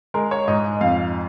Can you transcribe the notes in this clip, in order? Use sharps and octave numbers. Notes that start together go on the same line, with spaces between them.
G#3 A#4
C#5
G#2 D#5
D#5
F2 F5